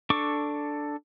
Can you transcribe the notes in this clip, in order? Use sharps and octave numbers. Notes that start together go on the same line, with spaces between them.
D4 A4 C#6 D6